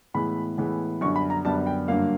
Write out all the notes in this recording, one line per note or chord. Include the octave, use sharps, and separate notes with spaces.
A2 E3 G#3 B3 B5
A2 E3 G#3 B3
F#2 D3 G3 B3 C#6
B5
A#5
F#2 D3 G3 B3 A5
G5
G2 D3 F#3 A#3 F5